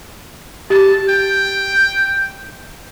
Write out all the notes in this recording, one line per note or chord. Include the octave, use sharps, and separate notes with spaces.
G4 A5
G5